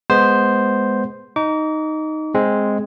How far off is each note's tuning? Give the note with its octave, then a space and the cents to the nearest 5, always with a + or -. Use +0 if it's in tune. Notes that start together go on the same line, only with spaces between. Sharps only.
G#3 +0 B3 +0 C5 +0
D#4 +0 D6 -40
G#3 +0 C4 +0